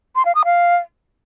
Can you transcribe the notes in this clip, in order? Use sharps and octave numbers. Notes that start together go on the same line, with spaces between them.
C6
F5
D#6
F5